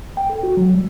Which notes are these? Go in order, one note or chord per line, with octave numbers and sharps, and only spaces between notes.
G5
A4
F#4
F#3
G3